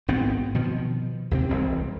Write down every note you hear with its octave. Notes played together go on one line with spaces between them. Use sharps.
G#1 B3 C4
B2 D#3 F3
D#2 C3 C4
E1 C2 C4